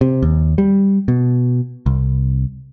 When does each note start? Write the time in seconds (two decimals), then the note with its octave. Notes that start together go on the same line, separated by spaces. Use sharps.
0.01 C3
0.22 D#2
0.58 G3
1.08 B2
1.86 C2